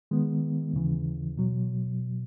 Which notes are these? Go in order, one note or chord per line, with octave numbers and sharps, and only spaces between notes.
D#3 G#3 B3
D#2 C#3 E3
B2 F#3